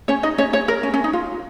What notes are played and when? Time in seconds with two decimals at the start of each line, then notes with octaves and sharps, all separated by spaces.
0.08 C#4 C#5
0.23 D#4 D#5
0.38 C#4 C#5
0.53 C#4 C#5
0.68 A#4
0.83 C#4
0.94 C#4
1.04 D#4
1.13 F4